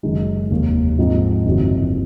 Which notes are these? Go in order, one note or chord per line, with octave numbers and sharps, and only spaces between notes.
F#1 F#2 D#3 G#3 D#4
F1 D#2 D#3 A#3
G#2 F3 C4 D#4
F#1 F2 C3 D#3 F#3